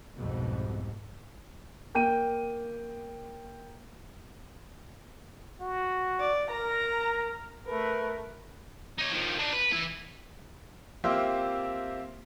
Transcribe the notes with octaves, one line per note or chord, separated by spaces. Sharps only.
C2 F2 G#2 B2
A#3 G5 D#7
F#4
D5
A#4 A#5
A3 A#4 B4
D#4 C#5
D#3 F3
D4 D#4
B4
E3 E4
A#3 C4 F4 G4 C5 E5